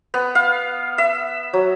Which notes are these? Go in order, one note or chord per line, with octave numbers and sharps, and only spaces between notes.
B3
F5
E5
F#3